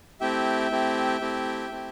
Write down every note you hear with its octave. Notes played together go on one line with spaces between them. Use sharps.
A3 C4 E4 G4 E5 G5
A3 C4 E4 G4
A3 C4 E4 G4
A3 C4 E4 G4